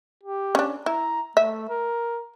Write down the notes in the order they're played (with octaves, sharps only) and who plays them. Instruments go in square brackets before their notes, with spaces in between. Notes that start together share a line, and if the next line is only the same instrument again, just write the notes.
[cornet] G4
[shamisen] C#4 D4
[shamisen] E4 [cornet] A#5
[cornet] A3 [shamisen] E5
[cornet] A#4